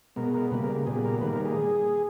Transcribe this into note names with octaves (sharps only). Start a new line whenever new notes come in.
B2 G#3 B3 A#4
A#4
C#3 G3 A#3 B4
A#4
A#2 G3 B3 G#4
A#4
D#3 G3 A#3 B4
A#4
G#4